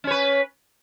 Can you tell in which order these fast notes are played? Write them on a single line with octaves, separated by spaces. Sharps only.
C#4 C#5 B4